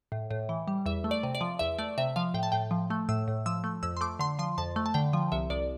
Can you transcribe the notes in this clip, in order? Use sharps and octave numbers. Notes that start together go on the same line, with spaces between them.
A2
A2
E3
G3
E2 E5
A3
D5
C3
D5
F3
E2 E5
A3 D5
C3 E5
F3 F5
A2 G5
A5
A2 G5
F3
A3
A2 E6
A2
F3 E6
A3
F2 E6
C6
A3 D6
D3 C6
F3 C6
F2 A5
A3
A5
D3 G5
F3
C2 E5
C2 D5